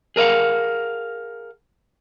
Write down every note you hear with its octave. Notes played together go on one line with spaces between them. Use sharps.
G#4 A#4 D#5 F5 F#5